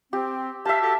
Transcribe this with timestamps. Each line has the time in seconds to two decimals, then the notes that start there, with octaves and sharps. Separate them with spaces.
0.13 C4 G4
0.65 G4 E5 F5 A5
0.82 F#4 G4 A4